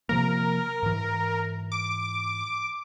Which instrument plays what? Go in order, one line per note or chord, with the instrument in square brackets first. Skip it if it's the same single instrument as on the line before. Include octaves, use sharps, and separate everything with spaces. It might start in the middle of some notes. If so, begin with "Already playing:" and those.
[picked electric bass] C3 F3 A#3 [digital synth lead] A#4
[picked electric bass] G#2 E3
[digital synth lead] D6